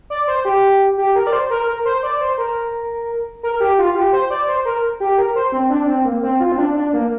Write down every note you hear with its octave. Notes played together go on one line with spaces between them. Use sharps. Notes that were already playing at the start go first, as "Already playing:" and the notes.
D5
C5
G4
G4
A#4
D5
C5
A#4
A#4
C5
D5
C5
A#4
A#4
G4
F4
G4
C5
D5
C5
A#4
G4
A#4
C5
C4
D4
C4
A#3
C4
F4
C4
D4
D4
A#3